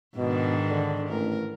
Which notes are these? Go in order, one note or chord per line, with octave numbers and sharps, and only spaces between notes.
G#2 B2 D#3 D4
D3
A1 A#4